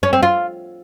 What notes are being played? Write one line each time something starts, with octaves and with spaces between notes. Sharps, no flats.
C#4
C4
F4